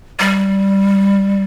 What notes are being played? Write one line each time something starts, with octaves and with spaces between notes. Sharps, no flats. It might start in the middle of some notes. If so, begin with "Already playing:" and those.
G3